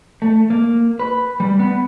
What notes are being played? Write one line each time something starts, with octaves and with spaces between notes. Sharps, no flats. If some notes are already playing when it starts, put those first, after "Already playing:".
A3
A#3
B4
G3
B3